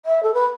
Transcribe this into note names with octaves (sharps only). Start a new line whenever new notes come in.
E5
A4
B4